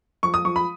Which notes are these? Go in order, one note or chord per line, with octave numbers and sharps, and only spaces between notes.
F3 C#6
D#6
F3 C#6
B5